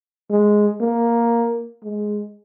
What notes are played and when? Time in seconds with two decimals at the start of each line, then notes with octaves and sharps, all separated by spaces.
0.31 G#3
0.81 A#3
1.84 G#3